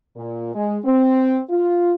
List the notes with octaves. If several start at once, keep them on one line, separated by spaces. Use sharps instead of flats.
A#2
G#3
C4
F4